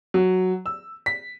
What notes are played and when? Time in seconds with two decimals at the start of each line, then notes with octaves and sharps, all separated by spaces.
0.14 F#3
0.66 E6
1.06 B6